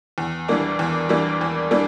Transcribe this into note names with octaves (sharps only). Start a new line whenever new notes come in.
E2
E3 G3 A#3 D4
E2
E3 G3 A#3 D4
E2
E3 G3 A#3 D4